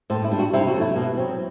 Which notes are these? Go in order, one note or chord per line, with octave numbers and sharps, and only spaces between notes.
A2 C5
E4
G3 D4
F#4
C3 E4
F#4
F#3 A3
E4
B2
F#3 C4